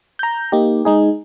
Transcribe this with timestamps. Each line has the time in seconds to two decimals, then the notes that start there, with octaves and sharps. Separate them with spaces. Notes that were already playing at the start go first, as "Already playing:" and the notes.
0.19 A#5 G6
0.52 A#3 D#4 G4
0.85 G#3 D#4 G#4